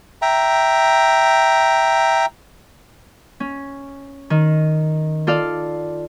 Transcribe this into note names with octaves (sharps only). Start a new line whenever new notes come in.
E5 G5 A#5
C#4
D#3
F4 A4 D5 F5